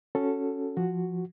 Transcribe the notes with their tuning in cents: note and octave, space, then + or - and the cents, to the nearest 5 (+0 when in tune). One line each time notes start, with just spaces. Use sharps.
C#4 +0 F#4 +0 A4 +0
F3 +0 F#4 +0